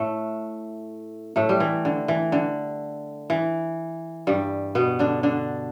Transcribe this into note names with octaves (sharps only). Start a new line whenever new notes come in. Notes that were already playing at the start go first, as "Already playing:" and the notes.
Already playing: A2 A3
A2 A3
G3
E3
D3
E3
D3
E3
G2 G3
B2 B3
D3 D4
D3 D4